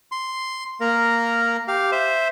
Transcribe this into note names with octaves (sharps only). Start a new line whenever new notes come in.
C6
A#3 A#4
G4 F5
C5 E5